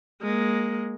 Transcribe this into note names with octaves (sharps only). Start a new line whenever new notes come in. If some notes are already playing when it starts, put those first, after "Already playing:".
G#3 A#3